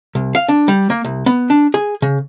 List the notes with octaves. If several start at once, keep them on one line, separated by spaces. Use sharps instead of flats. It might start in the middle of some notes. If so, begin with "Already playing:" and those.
C2
F5
D4
G3
A#3
C2
B3
D4
G#4
C#3